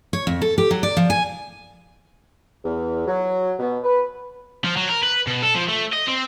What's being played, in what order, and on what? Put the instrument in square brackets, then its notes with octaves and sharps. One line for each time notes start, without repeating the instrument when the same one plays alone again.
[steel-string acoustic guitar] C#5
F2
A4
G4
F#3
D5
F3
G#5
[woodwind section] E2
F#3
B2
B4
[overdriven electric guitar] F3
F#3
A#4
B4
B2
A4
F3
A3
D#5
C4